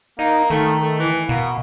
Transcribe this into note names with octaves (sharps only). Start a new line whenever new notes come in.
A#3 D#4
D#3 A3
A3
E3
B2 A#3